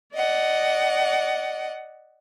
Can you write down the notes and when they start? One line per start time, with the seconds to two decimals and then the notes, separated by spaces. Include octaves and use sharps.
0.14 D5 D#5 F#5